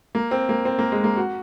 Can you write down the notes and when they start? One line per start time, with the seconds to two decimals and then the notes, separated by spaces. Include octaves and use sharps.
0.15 A#3
0.31 C4
0.49 A#3
0.65 C4
0.79 A#3
0.92 G#3
1.04 A#3
1.17 F#4